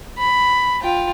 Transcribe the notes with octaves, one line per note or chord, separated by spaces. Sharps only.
B5
F4 G5